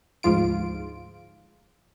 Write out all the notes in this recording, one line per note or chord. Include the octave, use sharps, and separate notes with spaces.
D2 G#2 F3 F4 D7